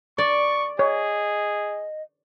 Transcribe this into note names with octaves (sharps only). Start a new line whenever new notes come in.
D5 C#6
G#4 C#5 D#5